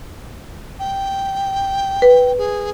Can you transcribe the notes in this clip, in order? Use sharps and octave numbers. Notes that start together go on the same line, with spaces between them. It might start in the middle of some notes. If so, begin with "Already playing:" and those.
G5
B4
G#4